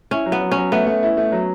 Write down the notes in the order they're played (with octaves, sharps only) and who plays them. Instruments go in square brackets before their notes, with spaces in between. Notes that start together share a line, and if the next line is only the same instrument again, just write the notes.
[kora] C#4 [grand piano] E4
[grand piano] F#3
[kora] B3
[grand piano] F#3
[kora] C#4
[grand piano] F#3
[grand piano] A3 [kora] B3
[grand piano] A3
E4
A3
F#3